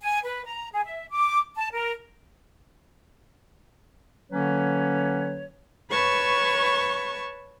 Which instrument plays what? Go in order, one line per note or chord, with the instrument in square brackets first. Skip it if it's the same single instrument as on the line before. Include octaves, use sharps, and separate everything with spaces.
[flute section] G#5
B4
A#5
G#4
E5
D6
A5
A#4
[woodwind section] D3 F#3 A#3 C#4 B4 C#5
[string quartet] B4 C#5 A5 C#6